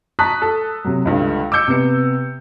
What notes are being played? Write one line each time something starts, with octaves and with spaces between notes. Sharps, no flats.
A5 A#5 C#6 D#6 F#6 B6
A4
C3 F#3
C#2 G2 D3 A3
D6 E6 G6 C#7
C3 B3 C#7